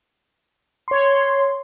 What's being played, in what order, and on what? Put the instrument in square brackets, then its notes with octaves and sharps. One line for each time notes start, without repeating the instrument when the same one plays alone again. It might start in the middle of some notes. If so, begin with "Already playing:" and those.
[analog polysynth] C#5 C6